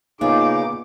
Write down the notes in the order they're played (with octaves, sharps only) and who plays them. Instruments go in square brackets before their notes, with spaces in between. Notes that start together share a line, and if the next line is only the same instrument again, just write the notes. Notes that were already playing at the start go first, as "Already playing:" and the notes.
[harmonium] A#2 D#4 G#4 [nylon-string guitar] C#3 F4 [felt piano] A#3 B3 [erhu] D6